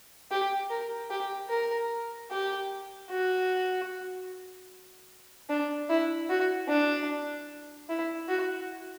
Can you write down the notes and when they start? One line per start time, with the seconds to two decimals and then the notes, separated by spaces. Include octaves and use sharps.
0.31 G4
0.70 A#4
1.10 G4
1.50 A#4
2.31 G4
3.11 F#4
5.50 D4
5.90 E4
6.29 F#4
6.69 D4
7.89 E4
8.29 F#4